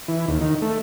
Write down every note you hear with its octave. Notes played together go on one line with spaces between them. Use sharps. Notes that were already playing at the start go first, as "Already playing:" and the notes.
E3
D#2
D#3
A3